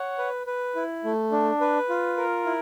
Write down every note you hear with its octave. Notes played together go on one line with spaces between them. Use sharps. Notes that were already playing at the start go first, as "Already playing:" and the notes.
Already playing: C#5 F#5
B4
B4
E4
A3
D4
B4
F4
A#4
E4